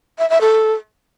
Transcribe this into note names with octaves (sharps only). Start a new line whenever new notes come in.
E5
E5
A4